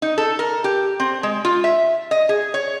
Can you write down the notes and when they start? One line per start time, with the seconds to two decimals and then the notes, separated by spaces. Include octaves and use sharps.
0.02 D#4
0.18 A4
0.39 A#4
0.64 G4
1.00 C4
1.23 G#3
1.45 F4
1.64 E5
2.11 D#5
2.29 G#4
2.54 C#5